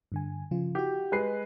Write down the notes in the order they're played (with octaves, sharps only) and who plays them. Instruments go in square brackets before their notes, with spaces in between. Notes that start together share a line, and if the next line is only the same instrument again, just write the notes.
[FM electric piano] G2 D3 G#5
C#3 F3 F4
[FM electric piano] E4 F#4 [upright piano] G4
[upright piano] G#3 B4 C7